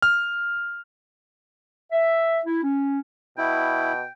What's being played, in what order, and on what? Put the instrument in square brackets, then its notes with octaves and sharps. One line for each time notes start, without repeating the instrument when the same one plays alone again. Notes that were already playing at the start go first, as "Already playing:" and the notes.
[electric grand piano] F6
[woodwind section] E5
E4
C#4
[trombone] B2 [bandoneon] E4 [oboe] G5